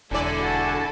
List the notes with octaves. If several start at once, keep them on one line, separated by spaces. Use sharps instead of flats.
E1 D3 E4 A4 D5 G#5
F#4 A5